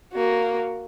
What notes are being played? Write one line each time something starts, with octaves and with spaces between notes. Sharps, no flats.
A#3 F#4